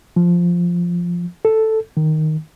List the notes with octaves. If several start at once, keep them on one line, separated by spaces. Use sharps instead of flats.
F3
A4
D#3